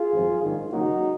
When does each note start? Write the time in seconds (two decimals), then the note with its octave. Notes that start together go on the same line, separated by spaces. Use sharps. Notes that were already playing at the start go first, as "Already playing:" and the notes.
Already playing: F4 G#4
0.13 G#1 F#2 F3
0.43 A#1 G#2 D#3
0.72 D#2 C#3 F#3 A#3 D#4 F#4